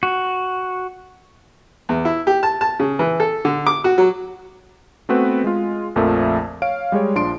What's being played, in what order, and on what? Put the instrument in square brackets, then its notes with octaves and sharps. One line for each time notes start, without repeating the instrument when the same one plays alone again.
[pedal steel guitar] F#4
[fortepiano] E2
E4
G4
A5
A5
C#3
E3
A4
D3
D6
F#4
F#3
[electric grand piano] A3 B3 C4 F#4 B4
G#3 F4
A#1 F2 F3 A3 A#4 E5
C#5 F5 D7
G3 G#3 G#4 C#5
A#1 F3 D4 C6 D7